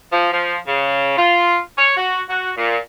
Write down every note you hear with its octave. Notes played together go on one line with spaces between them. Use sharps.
F3
F3
C#3
F4
C#5
F#4
F#4
A#2